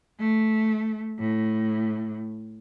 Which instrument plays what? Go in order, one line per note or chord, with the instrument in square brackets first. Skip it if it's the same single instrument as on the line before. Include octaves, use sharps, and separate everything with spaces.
[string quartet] A3
A2